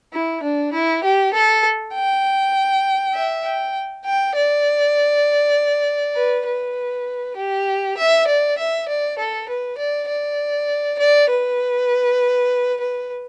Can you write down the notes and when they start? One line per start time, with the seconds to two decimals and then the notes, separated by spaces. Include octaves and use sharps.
0.13 E4
0.43 D4
0.73 E4
1.04 G4
1.33 A4
1.94 G5
3.14 E5
3.44 G5
4.05 G5
4.36 D5
6.16 B4
6.46 B4
7.37 G4
7.97 E5
8.27 D5
8.58 E5
8.88 D5
9.18 A4
9.49 B4
9.78 D5
10.08 D5
10.99 D5
11.30 B4
12.80 B4